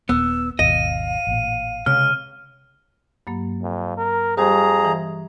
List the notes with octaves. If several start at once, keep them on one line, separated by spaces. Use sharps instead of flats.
D#1 B3 E6
G#1 D#2 B2 D#5 F5 D#7
A1 A#2
C#2 C3 F6
G2 F#3 A#3
F2
A#4
F2 G3 G4 G#4 C5 A#5
E3